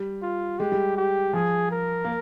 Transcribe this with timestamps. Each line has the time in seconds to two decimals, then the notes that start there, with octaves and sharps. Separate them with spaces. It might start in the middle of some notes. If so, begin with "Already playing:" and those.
Already playing: G3
0.22 F4
0.59 G#3 G4
0.72 G3
0.97 G4
1.33 F3 G#4
1.71 A#4
2.04 A#3